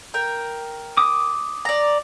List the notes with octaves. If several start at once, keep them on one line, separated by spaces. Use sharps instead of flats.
A#4 G5
D6 D#6
D5 A#5